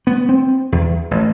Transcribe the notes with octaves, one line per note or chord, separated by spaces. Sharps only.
B3
C4
E2
A1